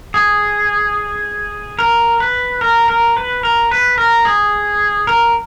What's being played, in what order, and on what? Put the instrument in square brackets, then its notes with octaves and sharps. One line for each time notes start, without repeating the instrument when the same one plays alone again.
[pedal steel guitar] G#4
A#4
B4
A#4
A#4
B4
A#4
B4
A#4
G#4
A#4